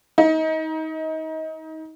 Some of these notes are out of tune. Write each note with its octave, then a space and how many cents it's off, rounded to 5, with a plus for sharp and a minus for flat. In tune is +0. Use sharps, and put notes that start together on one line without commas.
D#4 +30